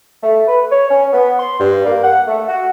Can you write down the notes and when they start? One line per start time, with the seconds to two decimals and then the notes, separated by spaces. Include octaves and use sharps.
0.23 A3
0.47 B4
0.71 C#5
0.90 C#4
1.13 B3
1.39 C6
1.60 G2
1.86 A#3
2.03 F#5
2.27 A3
2.47 F#4